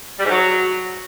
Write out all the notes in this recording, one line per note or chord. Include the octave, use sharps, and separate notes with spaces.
G3
G#2
F#3